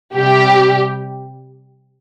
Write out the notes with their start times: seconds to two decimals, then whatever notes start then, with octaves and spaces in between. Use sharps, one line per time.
0.15 C3 G3 G4